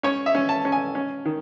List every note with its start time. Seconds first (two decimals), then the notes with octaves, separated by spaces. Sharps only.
0.03 C#4 C#5
0.26 E5
0.35 C#4
0.49 A5
0.65 C#4
0.72 G#5
0.95 C#4
1.25 D#3